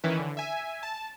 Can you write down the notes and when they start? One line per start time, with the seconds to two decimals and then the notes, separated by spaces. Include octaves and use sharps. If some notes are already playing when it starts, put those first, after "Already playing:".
0.04 D#3 E3 C#4 E4 B4
0.19 D3
0.37 E5 G#5
0.83 A5